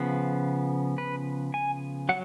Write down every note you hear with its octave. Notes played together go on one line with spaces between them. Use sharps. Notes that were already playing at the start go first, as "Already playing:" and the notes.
Already playing: C#3 F3 B3
B4
G#5
F#3 F#5